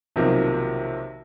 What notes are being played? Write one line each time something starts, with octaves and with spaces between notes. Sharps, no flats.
B1 C3 D#3 F3 A#3